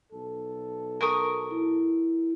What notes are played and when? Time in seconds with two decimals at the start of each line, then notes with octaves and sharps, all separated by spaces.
0.12 B1 A4
1.01 A#4 C#6 D#6
1.51 E4